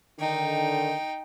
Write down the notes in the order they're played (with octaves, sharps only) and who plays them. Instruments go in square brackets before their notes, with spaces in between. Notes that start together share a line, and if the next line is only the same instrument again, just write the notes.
[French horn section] D3 D#3 [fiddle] D#4 G5